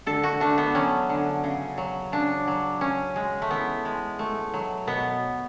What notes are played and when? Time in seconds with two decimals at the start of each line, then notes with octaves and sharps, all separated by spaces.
0.06 D3 A4
0.23 F#4
0.40 A3 D4
0.58 B3
0.75 F#3 C#4
1.09 D3
1.44 C#3
1.78 F#3
2.12 C#3 D4
2.47 F#3
2.81 C#3 C#4
3.16 G#3
3.42 A3
3.50 E3 B3
3.85 G#3
4.19 A3
4.54 F#3
4.87 B2 B3